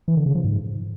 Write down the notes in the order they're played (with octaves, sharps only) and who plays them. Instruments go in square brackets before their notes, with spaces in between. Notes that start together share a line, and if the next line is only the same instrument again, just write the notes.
[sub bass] E3
D3
C#3
F3
G#2